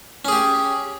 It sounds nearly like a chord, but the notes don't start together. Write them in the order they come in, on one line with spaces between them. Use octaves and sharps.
C#4 G#4 G4